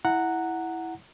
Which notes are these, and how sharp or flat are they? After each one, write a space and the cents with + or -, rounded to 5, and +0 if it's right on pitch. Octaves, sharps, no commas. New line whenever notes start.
E4 -5 F#5 +0 A#5 -15